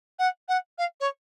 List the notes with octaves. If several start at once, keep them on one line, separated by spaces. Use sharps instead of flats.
F#5
F#5
F5
C#5